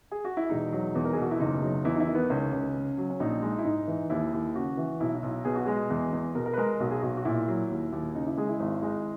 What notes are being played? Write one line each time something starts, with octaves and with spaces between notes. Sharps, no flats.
G#4
F#4
E4
E1 D#4
F#3
E2
A#4
G#4
B2 F#4
E4
F#1 D#4
F#3
E2 E4
D#4
E4
D#3
B3
C#2 C#4
C#2
C#3
F#3
C#4
A#1 D#4
G#3
E4
G#2 D#4
E3
D#2 E4
D#2
C#3 F#4
E3
B1 E4
E4
B1
B2 G#4
F#4
G#3 G#4
E2
E2
B2 A#4
A#4
B4
G#3 A#4
B1 F#4
G#4
B1 F#4
F#4
A#2 E4
F#3
D#2
D#2
C#3 D#4
E4
G#3 G#4
E4
G#1
G#3